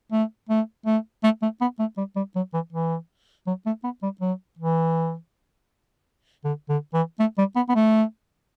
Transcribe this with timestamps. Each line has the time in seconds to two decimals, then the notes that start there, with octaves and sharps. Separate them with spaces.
0.12 A3
0.49 A3
0.86 A3
1.23 A3
1.42 A3
1.61 B3
1.79 A3
1.97 G3
2.16 G3
2.36 F#3
2.54 E3
2.73 E3
3.47 F#3
3.66 A3
3.84 B3
4.03 G3
4.21 F#3
4.59 E3
6.44 D3
6.69 D3
6.94 E3
7.20 A3
7.38 G3
7.56 B3
7.69 B3
7.75 A3